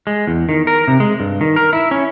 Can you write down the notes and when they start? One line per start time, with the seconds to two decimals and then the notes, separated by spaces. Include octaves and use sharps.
0.07 G#3
0.27 E2
0.49 D#3
0.67 A#4
0.88 C3
1.00 G#3
1.20 G2
1.41 D#3
1.56 A#4
1.73 E4
1.91 C#4